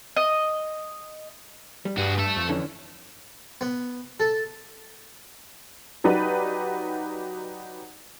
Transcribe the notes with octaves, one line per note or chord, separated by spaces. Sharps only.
D#5
G3
G2 F#4 G#4
A3 A4
F2
D3 E3 C#4
B3
A4
F#3 D#4 G4 B4 D5